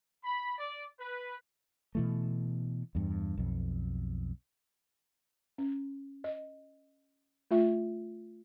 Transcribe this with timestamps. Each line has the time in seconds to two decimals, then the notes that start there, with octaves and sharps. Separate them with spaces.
0.23 B5
0.57 D5
0.99 B4
1.95 B2 E3 A3
2.95 E2 G2
3.37 B1 F2
5.58 C#4
6.24 D#5
7.51 A3 F4 E5